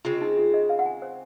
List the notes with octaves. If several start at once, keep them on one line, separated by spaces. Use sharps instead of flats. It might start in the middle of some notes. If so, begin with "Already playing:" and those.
C#3 G#3 C4 F4
D#4
F4
D#5
F5
F#5
G#5
C5